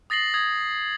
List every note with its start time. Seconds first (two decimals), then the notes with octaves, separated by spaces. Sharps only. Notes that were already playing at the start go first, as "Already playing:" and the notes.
0.10 D#6 A6 A#6 C7 F#7
0.34 D#6 G#6